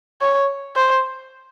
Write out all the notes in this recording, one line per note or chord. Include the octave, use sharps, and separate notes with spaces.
C#5
C5